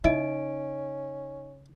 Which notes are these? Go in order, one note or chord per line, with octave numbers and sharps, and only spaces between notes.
C#3 C#4 D#4 E4 D#5 D7